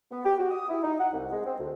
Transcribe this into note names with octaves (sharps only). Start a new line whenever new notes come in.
B3
G4
F#4
D#6
E4
D#4
F#5
C2
G#3
C4
D2